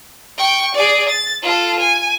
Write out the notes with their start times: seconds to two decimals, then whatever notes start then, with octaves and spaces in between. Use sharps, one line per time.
0.38 G5 C#6
0.75 G#4 D5
1.09 A6
1.43 F4 A4
1.79 G#5